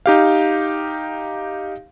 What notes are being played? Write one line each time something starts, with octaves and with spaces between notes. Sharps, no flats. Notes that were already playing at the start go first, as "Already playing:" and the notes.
D#4 G4 F5